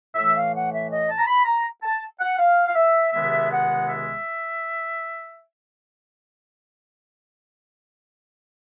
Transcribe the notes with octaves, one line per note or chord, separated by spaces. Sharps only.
A2 E3 A3 E5
F5
F#5
E5
D#5
A5
A#5
B5
A#5
A5
F#5
F5
F5
E5
C#2 C3 D#3 G#3 B3 E5
F#5
E5